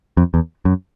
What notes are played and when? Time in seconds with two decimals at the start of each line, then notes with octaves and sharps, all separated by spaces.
0.17 F2
0.34 E2
0.65 F#2